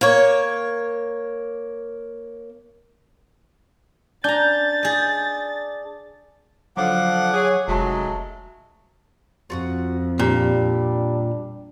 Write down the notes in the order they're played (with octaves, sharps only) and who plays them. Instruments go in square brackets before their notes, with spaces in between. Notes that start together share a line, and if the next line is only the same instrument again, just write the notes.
[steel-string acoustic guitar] A#3 C#5
[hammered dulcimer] D4 [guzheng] G#5 A#5 [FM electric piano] G6 [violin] A6
[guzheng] G#4 D#5
[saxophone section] D3 F3 [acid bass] F#3 [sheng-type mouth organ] F#5 D6
[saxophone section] G#4 [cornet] C#5
[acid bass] F1 [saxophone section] F#3 G#3 [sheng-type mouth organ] A3 [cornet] A5
[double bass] F2 [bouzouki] F4 F#4 F#5
[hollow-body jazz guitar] A#2 [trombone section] G3 D4 [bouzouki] G4